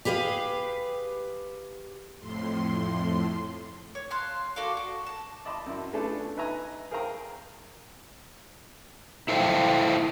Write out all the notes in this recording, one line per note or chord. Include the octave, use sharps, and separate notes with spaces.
G4 G#4 B4 E5 F5
F2 A2 C6
C#5
F5 A5 C6 F#6
F#4 A4 D5 F5
F#4
A5
D5 D#5 A5 B5 C6
F#2 E4
A3 B3 C#4 D4 F4 A4
D#4 B4 E5 G#5 A#5
G#4 A#4 C5 F5 G5 A#5
E4 A4 C5 D#5 F5 G5